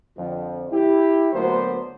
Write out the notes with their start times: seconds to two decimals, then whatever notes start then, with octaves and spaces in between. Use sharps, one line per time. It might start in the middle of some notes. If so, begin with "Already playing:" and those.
0.17 F2 D3 F3
0.71 E4 G4
1.33 D2 F#3 A#3 B3 D4 C5